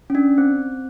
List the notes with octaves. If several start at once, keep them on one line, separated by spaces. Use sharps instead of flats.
C#4
D4
C4